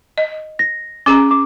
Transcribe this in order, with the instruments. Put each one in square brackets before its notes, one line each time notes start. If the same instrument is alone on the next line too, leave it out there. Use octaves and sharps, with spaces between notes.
[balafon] D#5
[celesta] A#6
[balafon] C#4 G#4 A#5 [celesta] D6
[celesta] D6